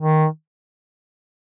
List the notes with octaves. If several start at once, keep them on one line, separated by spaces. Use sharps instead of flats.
D#3